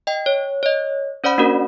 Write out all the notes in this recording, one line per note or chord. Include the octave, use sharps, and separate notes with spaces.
D#5 G5
C#5
C#5 D#5
C#4 C5 D5 F#5 B5
A#3 C#4 D4 F#4 A#4